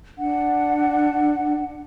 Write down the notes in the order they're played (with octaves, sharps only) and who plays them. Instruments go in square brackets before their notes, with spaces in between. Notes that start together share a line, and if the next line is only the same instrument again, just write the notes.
[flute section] D4 F#5